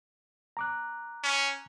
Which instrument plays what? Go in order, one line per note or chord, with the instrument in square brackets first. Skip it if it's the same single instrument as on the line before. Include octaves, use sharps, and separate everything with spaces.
[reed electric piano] A#5 D6 F#6
[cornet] C#4